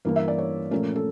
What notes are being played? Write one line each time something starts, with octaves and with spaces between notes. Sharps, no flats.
G2 E3 A#3 A#4
E5
D5
C#5
A#2 F3 A3 C#4 A#4
A4